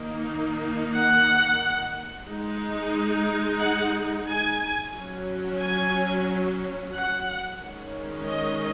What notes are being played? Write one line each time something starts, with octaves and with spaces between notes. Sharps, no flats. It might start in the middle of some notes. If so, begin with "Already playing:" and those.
Already playing: D#3 A#3 D#4
F#5
G#3 D#4
F#5
G#5
F#3 C#4
G#5
F#5
D#3 G#3 C#4
D#5